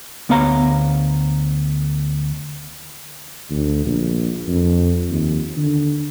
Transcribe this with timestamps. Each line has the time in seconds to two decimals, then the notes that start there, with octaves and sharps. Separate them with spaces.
0.29 D2 B3 C#5 F5 A#5
3.50 D2
3.85 A#1
4.48 F2
5.10 D#2
5.57 D3